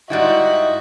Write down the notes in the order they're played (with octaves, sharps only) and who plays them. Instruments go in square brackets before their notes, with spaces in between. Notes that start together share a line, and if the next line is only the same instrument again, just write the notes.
[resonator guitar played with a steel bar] G#2 G3 E4 [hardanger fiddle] F#4 E5 [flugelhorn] D#5